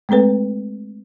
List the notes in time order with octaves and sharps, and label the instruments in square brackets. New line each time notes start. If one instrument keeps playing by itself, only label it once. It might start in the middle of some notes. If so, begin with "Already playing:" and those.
[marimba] G#3 A3 C4 A4 B4